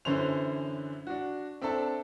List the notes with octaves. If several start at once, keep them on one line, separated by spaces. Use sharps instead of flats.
F#2 D3 E3 C#4 C5 F7
D4 F#4
C4 D4 A4 E5 A5